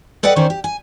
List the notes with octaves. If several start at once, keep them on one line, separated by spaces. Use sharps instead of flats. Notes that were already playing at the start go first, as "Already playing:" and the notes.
A4 B4 D5 D#5 F#5 G5
D2 D#3 C#4 C5 D5
G4
G#5